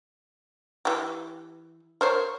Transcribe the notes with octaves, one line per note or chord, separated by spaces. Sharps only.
E3 G4
A#4 C5 C#5